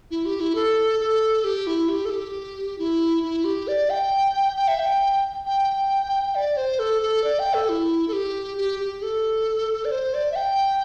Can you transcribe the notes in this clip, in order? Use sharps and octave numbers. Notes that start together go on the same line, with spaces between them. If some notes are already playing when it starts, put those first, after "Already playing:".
E4
G4
E4
A4
A4
G4
E4
G4
A4
G4
E4
E4
G4
D5
G5
G5
E5
G5
G5
D5
C5
A4
A4
D5
G5
A4
E4
A4
G4
G4
G4
A4
D5
C5
D5
E5
G5